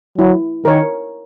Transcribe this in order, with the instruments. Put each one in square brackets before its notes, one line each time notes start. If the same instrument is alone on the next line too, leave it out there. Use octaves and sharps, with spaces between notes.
[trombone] F#3 [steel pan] E4
[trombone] D#3 [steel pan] A#4 C#5